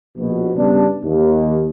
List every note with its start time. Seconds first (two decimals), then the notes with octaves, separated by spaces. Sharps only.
0.17 A#1 B2
0.55 G2 C#3 B3 D4
1.04 D#2